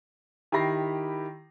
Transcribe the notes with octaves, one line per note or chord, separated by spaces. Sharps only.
D#3 E4 G4 B5 A#6 C7